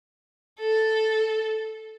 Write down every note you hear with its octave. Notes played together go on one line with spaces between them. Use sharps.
A4